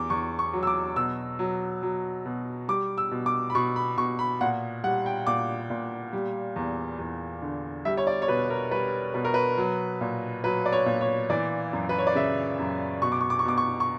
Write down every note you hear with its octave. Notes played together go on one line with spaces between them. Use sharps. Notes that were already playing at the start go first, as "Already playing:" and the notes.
Already playing: E2 D6
E2 C#6
C#6
F#3
E6
D6
B2 E6
F#3
F#3
B2
G3 D6
E6
B2
D6
B5
B2 C#6
B5
B2 C#6
B5
A#2 F#5
G3 F#5
G5
A#2 D6
A#2
G3
E2
E2
D3
G3 E5
C#5
D5
C#5
B2 B4
A#4
G3 B4
B2 B4
A#4
B4
F#3
A#2
F#3 B4
D5
C#5
A#2
C#5
E3 D5
F#2
B4
C#5
D5
C#3 E5
F#2
B2 C#6
D6
C#6
D6
C#6
B2 D6
C#6
C#6